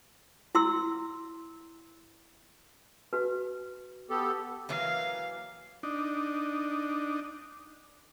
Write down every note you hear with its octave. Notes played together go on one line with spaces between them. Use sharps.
E4 C6 E6
F#4 B4
B3 G4 A4
E3 F#3 A#3 F5
D4 D#4